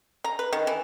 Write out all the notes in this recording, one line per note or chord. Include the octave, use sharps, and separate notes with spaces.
A#5
B4
D#3
E3